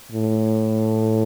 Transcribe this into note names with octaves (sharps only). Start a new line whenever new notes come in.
A2